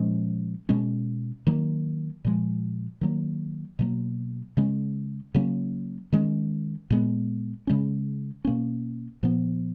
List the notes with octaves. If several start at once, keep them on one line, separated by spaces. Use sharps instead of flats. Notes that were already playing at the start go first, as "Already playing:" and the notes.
Already playing: A#2 F3 G#3 C#4
B2 G#3 C#4
D#3 F#3 A#3
A#2 F3 G#3
D#3 F#3 A#3
B2 F#3 A#3
C#3 G#3 C#4
C#3 F#3 A#3 C#4
D#3 G#3 C#4
A#2 G#3 B3
C#3 G#3 C#4
B2 A#3 C#4
A#2 F3 B3